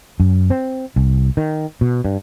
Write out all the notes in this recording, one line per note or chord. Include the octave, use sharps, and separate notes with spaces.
F#2
C4
C2
D#3
B2
G2